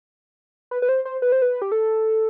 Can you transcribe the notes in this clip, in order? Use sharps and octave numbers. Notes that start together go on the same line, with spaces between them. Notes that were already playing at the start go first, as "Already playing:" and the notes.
B4
B4
C5
C5
B4
C5
B4
G4
A4